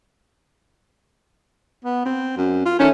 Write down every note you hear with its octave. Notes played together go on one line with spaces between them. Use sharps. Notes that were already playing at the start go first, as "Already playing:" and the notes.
B3
C4
F#2
F4
D#3 A3 C#4